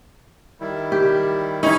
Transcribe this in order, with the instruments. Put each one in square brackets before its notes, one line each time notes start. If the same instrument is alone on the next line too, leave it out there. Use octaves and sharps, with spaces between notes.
[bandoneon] D#3 G3 E4
[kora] G4
[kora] C#4 E4 [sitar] D#4